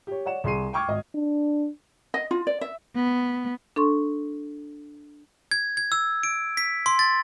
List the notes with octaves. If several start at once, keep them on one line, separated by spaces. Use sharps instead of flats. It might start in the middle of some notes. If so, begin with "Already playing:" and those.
G4 C#5
C#5 D5 F#5 E7
C2 G#4 C6 C#6 C7 D#7
G5 C#6 D6 F6 G#6
G#1 D#5
D4
D#5
F4
D5
E5
B3
D4 A4 C6 C#6
G#6
G#6
E6
D7
B6
C6
A6